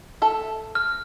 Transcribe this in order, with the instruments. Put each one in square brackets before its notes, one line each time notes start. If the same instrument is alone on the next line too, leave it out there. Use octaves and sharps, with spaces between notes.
[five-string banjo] A4 E5
[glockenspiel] F6